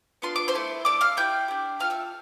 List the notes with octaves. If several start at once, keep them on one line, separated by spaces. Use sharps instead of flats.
B3 D4 F4 A4 C6
D6
C5 C6
A3 E4 A4
D4 A4 D5 D6
F5 F6
A3 E4 G4 G5 G6
D4 G4
D4 F4 A4 F5 F6
E5 E6